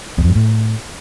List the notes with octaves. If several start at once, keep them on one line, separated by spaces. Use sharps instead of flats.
E2
F2
G2
A2